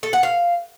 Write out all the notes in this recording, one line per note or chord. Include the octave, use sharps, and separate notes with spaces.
A4
F#5
F5